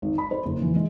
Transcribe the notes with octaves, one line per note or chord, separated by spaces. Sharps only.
G#1
B5
C5
F#1
E3
G#3